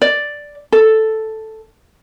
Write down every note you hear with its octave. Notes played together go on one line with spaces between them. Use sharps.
D5
A4